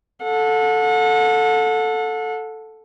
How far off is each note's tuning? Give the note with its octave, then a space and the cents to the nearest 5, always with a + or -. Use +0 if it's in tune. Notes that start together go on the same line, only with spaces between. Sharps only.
A4 +0 F#5 -35